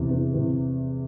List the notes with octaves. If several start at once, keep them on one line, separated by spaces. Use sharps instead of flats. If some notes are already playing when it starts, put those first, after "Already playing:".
Already playing: E2 C3 E3
E2
C3 E3